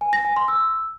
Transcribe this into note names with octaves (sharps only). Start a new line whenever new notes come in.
G#5
A#6
G#5
C6
E6